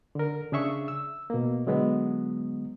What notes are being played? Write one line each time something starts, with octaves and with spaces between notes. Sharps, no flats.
D3 A#4
C#3 D4 G#4 E5 C#6
E6
B2 A#3
D3 F#3 G#3 B3